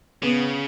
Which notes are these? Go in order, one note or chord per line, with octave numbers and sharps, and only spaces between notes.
C#3 B3